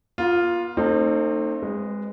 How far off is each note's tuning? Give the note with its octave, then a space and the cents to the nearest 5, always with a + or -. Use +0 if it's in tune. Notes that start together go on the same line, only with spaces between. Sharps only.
B3 -45 F4 +0
A3 +35 C4 +20 D#4 -30
G#3 -15 B4 +0